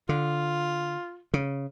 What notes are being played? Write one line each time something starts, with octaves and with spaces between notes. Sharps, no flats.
D3 F4
C#3